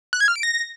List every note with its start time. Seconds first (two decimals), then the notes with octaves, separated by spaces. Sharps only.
0.13 F#6
0.20 G#6
0.28 F6
0.36 D7
0.43 A#6